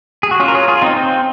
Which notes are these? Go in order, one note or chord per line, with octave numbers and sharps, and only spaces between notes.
G#4
F#4
C#4 F4
A#4
F4 G#4
F4 G#4
C4 D#4
C4